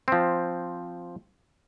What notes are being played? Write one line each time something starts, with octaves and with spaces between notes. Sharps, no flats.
F3 C4